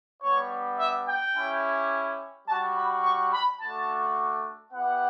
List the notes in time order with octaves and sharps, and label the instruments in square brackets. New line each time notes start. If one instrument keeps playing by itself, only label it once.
[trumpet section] G3 B3 D4 C#5
E5
G5
C#4 E4 G4
G3 D4 F#4 A5
B5
C#6
B5
A3 D4 F#4 A5
B3 E4 G4 F#5